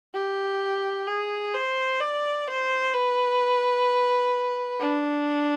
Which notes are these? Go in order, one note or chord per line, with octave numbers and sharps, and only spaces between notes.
G4
G#4
C5
D5
C5
B4
D4